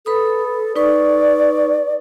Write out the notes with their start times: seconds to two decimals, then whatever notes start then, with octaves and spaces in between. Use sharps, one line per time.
0.06 A4 B4 B5 D#6
0.76 D#4 B4 D5 C#6